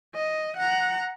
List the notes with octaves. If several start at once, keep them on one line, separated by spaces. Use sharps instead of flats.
D#5
F#5 A#5